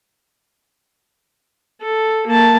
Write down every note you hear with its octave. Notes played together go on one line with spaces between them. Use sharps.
A4
A#3 A5